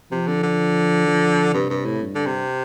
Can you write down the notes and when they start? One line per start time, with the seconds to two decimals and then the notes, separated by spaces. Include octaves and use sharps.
0.12 C3 F3
0.28 D3
0.43 D3
1.07 F3
1.54 G2 C3
1.70 G2
1.86 A2
2.02 G2
2.15 D3
2.26 C3